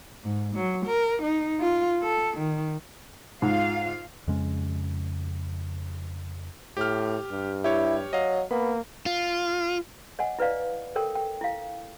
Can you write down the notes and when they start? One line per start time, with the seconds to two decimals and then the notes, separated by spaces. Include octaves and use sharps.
0.24 G#2
0.56 F#3
0.86 A#4
1.23 D#4
1.60 F4
2.02 A4
2.38 D#3
3.42 G#2 F4 F5
4.28 F2 C#3 G#3 C#4
6.77 A2 G4 F6
7.32 G2
7.64 E4 G4 C#5
8.13 F#3 D#5 F5
8.51 A#3 B3 B5
9.06 F4
10.19 C#5 D#5 F#5 G#5
10.39 E4 B4 D5 F5
10.96 A4 A#4 C#5 G5
11.15 G5
11.41 E4 F5